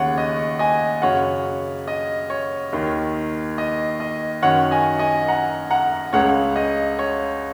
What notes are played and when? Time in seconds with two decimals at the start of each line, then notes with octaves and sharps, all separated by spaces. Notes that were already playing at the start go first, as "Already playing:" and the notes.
Already playing: D#2 C#3 C#5 F#5
0.18 D#5
0.59 D#5 G#5
1.02 F#2 C#3 C#5 F#5
1.88 D#5
2.30 C#5
2.73 D#2 D#3
3.58 D#5
4.00 D#5
4.42 F#2 D#3 C#5 F#5
4.71 D#5 G#5
4.99 D#5 G#5
5.28 F#5 A#5
5.70 F#5 A#5
6.13 C#2 C#3 C#5 F#5
6.56 D#5
6.99 C#5